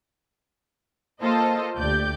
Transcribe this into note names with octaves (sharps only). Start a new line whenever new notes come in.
A#3 F4 A4 C5 D#5
D2 G4 D5 G6